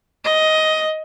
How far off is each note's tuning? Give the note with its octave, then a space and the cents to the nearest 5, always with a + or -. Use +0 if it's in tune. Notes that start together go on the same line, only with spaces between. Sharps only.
D#5 +10